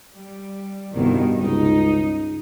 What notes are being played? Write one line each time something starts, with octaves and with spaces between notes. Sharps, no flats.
G3
C2 G2 B2 D#3
C#2 D#4